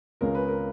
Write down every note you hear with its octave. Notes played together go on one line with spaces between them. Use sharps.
C#2 C#3 G#3 A#4
B4
A#4